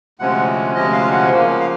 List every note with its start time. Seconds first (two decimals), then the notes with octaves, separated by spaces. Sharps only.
0.19 D2 C3 F3 G#3 C#4 F#5
0.74 D2 C3 F3 G#3 C#4 D#5
0.93 F5
1.11 F#5
1.30 C#3 F3 A#3
1.60 F5